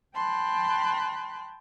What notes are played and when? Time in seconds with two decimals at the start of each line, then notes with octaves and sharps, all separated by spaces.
0.15 G5 A5 B5 C6 F#6